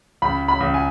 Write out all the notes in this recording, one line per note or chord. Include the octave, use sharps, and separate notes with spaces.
C#2 B5
B5
C#2
G#5